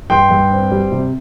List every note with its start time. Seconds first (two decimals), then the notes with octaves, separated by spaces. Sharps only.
0.10 G2 G5 C6
0.30 G2
0.51 C4
0.71 G3
0.92 C3